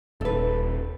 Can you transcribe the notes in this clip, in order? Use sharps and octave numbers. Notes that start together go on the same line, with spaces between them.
D#1 A4 B4